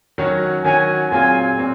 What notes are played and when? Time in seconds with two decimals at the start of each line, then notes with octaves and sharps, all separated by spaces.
0.18 D#3 F#3 C#4 F#4
0.64 D#3 F#3 C#4 F#4 G#5
1.11 A#2 F#3 C4 F4 G#4 G#5
1.57 A#2 F#3 C4